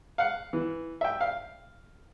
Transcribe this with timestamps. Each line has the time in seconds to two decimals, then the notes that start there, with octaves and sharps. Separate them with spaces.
0.18 F5 F#5
0.53 E3
1.01 E5 G5
1.21 F5